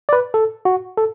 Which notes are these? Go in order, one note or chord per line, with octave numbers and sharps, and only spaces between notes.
D5
B4
A4
F#4
A4